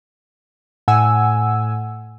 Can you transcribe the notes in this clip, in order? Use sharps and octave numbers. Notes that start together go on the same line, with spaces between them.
A2 F#5 G#5 E6